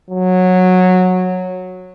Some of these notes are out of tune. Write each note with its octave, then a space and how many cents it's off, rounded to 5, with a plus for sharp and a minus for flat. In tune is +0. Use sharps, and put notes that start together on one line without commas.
F#3 -15